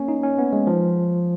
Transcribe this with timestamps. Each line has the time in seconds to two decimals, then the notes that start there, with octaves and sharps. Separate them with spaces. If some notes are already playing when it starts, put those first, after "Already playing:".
Already playing: A#3 C#4
0.08 D#4
0.23 C#4
0.38 B3
0.53 G#3
0.67 F3